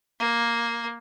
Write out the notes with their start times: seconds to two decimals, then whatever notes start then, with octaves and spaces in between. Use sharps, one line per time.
0.20 A#3